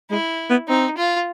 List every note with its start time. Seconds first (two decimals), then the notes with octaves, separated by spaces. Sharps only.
0.11 G#3 E4
0.50 B3
0.68 C4 D#4
0.97 F4